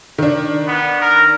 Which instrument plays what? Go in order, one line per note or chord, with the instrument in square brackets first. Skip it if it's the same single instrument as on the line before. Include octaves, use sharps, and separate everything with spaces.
[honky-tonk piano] D#3 D4
[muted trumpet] B3
A#4